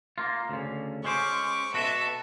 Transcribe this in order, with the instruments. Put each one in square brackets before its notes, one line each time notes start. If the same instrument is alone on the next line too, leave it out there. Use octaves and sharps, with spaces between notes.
[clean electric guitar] A#3 F4
D2 C#3
[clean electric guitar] G#3 C#4 C5 [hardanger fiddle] C#6 D6
[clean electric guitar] B2 F#4 [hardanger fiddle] A4 E5